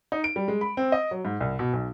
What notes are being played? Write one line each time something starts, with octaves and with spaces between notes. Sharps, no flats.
D#4
D7
G3
G#3
B5
C4
D#5
F#3
G#2
C2
B2
B1